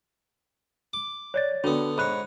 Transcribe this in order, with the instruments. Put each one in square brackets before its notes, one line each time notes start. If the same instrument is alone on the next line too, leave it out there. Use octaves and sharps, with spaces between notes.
[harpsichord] D6
[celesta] C#5 D5 A6
[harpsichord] D3 B3 [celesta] D4 F#4
[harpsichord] G#2 C#5 [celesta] B5 F#6